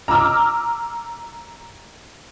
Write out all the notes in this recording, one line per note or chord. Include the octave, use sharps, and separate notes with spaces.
A#5 D6 E6 F6